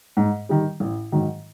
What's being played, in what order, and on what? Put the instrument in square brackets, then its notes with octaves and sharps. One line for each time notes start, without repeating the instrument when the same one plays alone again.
[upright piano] G#2
D#3 G3
A1
G#2 D#3 F#3